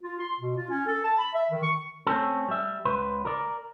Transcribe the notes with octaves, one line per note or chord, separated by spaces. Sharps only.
F4
C6
B2
F4
C#4
A4
A5
B5
E5
D#3
C#6
A3 C4 C#4 A4
G3 E5
C#2 B4 C5
A#4 D5